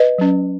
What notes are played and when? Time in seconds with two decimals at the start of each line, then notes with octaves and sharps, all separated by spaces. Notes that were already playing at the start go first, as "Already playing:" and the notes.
Already playing: B4 D#5
0.18 F#3 C#4